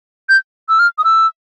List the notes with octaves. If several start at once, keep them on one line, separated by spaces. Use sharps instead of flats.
G6
E6
F6
D#6
E6